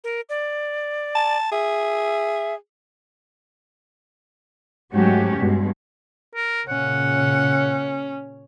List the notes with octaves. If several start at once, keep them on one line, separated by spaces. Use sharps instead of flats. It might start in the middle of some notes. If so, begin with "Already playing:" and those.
A#4
D5
A5
G#4 E5
G#2 F#3 A3 C#4 F#4 G4
G2 B2 G#3
A#4
A#2 C#3 C#4 F#5